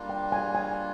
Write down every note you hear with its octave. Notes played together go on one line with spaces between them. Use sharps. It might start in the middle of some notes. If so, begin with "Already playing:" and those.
Already playing: G3 A#3 D4 F4
G5
G#5
G#5